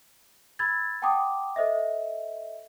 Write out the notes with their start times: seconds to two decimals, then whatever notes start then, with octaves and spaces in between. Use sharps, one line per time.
0.59 B5 E6 G#6 A6
1.02 F#5 G5 A5 C6 D6 D#6
1.56 A4 C5 D#5 E5